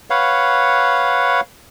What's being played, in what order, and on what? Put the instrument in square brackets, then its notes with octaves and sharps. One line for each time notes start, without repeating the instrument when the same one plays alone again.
[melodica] B4 C#5 F5 F#5